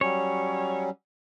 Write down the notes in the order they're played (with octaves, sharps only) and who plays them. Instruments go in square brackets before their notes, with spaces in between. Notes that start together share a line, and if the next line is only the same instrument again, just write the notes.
[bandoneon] F#3 G3 C#4 [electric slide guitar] C#5